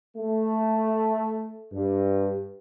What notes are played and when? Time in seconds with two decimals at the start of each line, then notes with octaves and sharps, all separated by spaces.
0.17 A3
1.73 G2